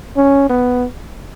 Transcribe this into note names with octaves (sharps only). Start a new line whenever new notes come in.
C#4
B3